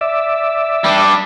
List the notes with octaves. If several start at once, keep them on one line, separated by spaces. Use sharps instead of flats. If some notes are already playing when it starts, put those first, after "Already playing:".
D5 E5
G3 D4